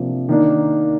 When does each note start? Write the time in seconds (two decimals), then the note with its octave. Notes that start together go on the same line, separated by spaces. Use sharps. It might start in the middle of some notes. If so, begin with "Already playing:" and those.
Already playing: C3 F3 A#3 D4
0.29 D#3 A#3 D4